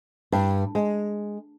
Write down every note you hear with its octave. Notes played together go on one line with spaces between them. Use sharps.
G2
G#3